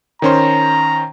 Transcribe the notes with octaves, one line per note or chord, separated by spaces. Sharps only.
D#3 C#4 C5 A#5